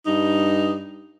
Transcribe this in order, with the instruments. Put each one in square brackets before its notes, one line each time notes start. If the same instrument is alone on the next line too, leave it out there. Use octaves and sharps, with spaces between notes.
[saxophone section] G2 D#4